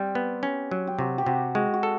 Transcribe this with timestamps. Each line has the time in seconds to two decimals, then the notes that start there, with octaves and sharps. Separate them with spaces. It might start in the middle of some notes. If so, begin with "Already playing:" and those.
Already playing: G3 C4 G4
0.15 B3
0.43 C#4
0.71 F#3
0.87 G4
0.99 C3 F#4
1.18 G4
1.26 C3 F#4
1.55 G#3 F#4
1.74 F#4
1.83 A4